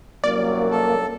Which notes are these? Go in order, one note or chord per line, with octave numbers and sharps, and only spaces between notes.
C2 F#2 F#3 A#3 D5
A4